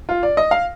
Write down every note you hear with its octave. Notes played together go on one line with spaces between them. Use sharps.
F4
D5
D#5
F5